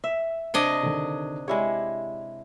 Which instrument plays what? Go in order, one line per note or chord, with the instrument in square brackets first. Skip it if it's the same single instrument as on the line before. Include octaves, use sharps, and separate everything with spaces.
[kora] E5
[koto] C3 D4 D#5 [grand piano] G#6 D7
[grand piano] D3 D#3
[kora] G#3 E4 C#5 [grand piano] G4 D5